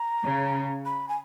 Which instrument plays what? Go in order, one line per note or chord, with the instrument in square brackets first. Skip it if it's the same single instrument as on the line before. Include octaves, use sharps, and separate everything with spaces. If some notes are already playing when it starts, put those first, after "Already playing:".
Already playing: [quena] A#5
[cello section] C#3
[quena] B5
G#5